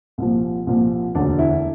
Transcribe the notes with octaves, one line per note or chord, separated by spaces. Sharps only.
C2 A#2 F3
C2 A#2 F3
E1 D2 D3 D4
E4